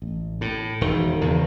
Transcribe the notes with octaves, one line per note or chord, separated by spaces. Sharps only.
A1
A2
E1 D#3
E2 C#3